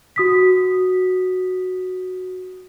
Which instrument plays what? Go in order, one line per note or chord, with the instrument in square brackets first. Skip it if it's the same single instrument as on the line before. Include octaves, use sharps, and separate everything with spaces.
[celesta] F#4 D#6 B6